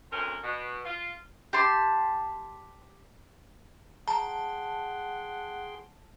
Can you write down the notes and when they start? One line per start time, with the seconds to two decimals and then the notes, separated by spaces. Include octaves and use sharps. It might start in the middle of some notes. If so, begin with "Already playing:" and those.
0.12 D2 C4 C#4 A#4
0.43 B2
0.84 F4
1.53 G4 A5 C6
4.08 G#4 F#5 G5 A5 A#5 C6